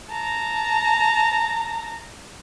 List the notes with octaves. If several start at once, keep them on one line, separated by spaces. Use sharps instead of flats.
A5 A#5